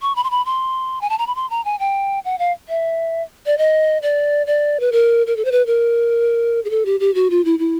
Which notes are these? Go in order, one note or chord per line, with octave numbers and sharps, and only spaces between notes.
C#6
B5
C6
B5
C6
G#5
A5
A#5
B5
C6
A#5
G#5
G5
F#5
F5
E5
D5
D#5
D5
D5
B4
A#4
A#4
A4
C5
B4
A#4
G#4
A4
G4
G4
F#4
F4
E4
E4